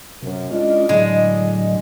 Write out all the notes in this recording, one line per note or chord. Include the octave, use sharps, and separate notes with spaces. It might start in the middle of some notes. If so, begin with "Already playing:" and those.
F#2 C3
G#3 C#4 D4 E4 F4 D#5
A2 D3 F#3 G#3